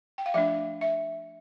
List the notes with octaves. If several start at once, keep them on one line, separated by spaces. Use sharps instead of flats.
G5
F5
F3 A3 D4 E5
E5